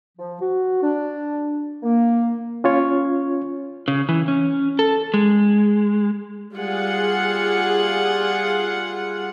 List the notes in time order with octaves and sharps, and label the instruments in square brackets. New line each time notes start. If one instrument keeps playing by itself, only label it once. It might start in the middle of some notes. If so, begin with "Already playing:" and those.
[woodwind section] F3
F#4
D4
A#3
[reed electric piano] C#4 F4 C#5
[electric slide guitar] C#3
E3
C#4
A4
G#3
[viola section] G3 F4 G#4 F#5